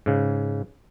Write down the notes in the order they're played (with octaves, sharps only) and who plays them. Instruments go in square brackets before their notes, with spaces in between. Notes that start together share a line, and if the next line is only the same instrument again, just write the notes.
[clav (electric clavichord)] G#2 C#3